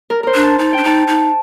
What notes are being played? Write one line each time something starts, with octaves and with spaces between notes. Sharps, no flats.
A#4
A#4 C5
D4
A5
D#4 A5
D4 G5
D#4 A5
D#4